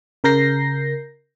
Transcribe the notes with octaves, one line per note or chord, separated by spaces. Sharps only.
C#3 A#4 G6 A#6 C7